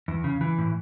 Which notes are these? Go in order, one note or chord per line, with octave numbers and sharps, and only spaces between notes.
E2
C#3
E3
A2